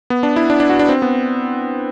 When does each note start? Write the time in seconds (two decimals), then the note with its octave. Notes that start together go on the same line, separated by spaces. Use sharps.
0.10 B3
0.23 D4
0.36 E4
0.50 D4
0.60 D4
0.70 F#4
0.79 D4
0.89 C4
1.02 B3